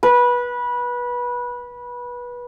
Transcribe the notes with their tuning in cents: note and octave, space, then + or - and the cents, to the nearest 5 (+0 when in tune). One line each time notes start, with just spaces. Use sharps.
B4 -20